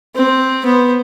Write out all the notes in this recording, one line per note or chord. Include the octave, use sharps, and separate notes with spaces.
C4
B3 C5